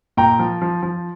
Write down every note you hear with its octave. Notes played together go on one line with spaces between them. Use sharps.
A#2 G5 A#5
F3
F3
F3